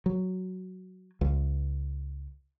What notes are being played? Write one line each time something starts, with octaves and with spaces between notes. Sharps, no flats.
F#3
C#2